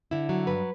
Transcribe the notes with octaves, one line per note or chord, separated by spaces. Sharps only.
D3 E4
F#3
G2 B4